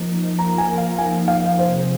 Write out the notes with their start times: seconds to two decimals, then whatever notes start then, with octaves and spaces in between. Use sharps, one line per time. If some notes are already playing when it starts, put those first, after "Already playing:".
Already playing: F3 A#3 D#4
0.38 F3 A#3 F4 A#4 A#5
0.58 G#5
0.78 F5
0.98 F3 A#3 D#4 G#5
1.28 F5
1.58 C3 F3 C4 G#4 C5